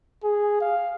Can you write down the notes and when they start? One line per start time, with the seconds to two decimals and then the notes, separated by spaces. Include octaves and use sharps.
0.24 G#4
0.61 F5